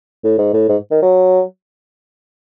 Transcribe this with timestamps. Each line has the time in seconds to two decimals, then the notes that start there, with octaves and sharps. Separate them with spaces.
0.24 A2
0.38 G#2
0.54 A2
0.69 G#2
0.91 D#3
1.03 F#3